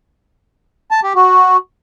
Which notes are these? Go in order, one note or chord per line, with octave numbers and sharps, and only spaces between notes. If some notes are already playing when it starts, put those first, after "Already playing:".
A5
G4
F#4